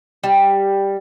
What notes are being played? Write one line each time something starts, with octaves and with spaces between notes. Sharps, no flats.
G3